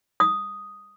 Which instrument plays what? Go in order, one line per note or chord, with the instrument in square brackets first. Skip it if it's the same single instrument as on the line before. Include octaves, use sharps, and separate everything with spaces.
[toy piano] D#6